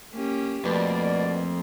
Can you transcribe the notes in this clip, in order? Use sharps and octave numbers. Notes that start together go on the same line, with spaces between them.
A#3 C#4 G4
F2 B2 A3 A#3 D5